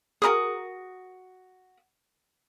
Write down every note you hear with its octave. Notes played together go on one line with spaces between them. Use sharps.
F#4 G#4 A#4 C5 D#6